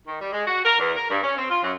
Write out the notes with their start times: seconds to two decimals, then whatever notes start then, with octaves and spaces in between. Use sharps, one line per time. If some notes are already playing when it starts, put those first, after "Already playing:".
0.07 D#3
0.20 G3
0.32 G#3
0.47 F#4
0.65 A#4
0.79 E2
0.96 A#4
1.10 G2
1.23 C#4
1.37 C4
1.50 F4
1.63 F#2